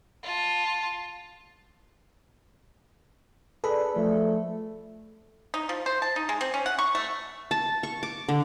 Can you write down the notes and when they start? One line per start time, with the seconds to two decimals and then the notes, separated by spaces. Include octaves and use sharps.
0.23 F4 A5
3.64 D4 G#4 A4 B4 B5
3.96 F3 A3
5.54 D#4
5.69 F3
5.86 C5
6.02 A5
6.16 D#4
6.29 G#3
6.41 C4
6.54 C#4
6.66 F#5
6.79 C#6
6.95 A3
7.51 A5
7.83 C#6
8.03 D6
8.28 D3